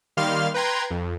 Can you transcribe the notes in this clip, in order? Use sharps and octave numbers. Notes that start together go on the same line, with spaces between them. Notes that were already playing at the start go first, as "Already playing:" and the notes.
D#3 G3 A#3 F5 C6 F6
B4 G5 A#5 C6 G#6
F2